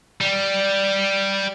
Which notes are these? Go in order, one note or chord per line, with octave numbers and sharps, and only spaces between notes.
G3